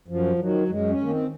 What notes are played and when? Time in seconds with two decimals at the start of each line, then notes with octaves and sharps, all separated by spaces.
0.08 F#2 F3
0.39 D#3 F#3
0.69 F#2 G#3
0.90 C#4
1.00 D#3 A#3
1.10 C4